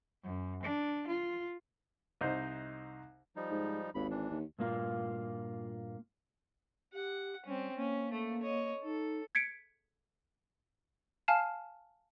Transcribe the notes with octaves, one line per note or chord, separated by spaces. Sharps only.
F#2
D4
F4
C2 D#4 C5
F3 G3 D#4
G#2
G#1 D#2 B5
E3 D4
D#2
G2 A#2 A#3 F4
G4 F#5
G3 C4 C#4
A#3 C#4
A3
C#5 D#5
D#4 A4
G#6 B6 C#7 D7
F5 G#5 A5 F6 C7 E7